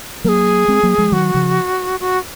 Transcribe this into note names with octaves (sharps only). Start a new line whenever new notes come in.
F#3 A#3 G#4 A#4
G#3 C4
F#3 A#3
F3 G#3
D#3 F#3 F#4
C#3 F3
F#4